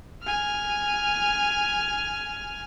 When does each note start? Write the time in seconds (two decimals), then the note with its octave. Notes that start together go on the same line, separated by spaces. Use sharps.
0.23 G#5 F6